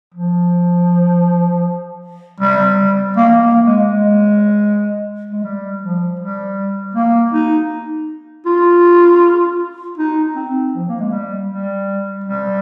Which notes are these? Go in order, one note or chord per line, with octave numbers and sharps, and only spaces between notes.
F3
G3
A#3
A#3
G#3
G#3
G#3
G3
F3
G3
A#3
D#4
F4
D#4
C4
F3
A#3
G#3
G3
G3
G3